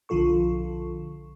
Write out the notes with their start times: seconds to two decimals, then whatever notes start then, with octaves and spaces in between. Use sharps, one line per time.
0.09 B1 D3 F3 F4 A4 C#6